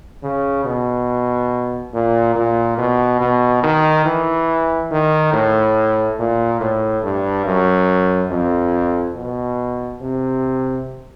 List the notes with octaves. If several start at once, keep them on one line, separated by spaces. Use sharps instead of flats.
C#3
B2
A#2
A#2
B2
B2
D#3
E3
D#3
A2
A#2
A2
G2
F#2
F2
B2
C3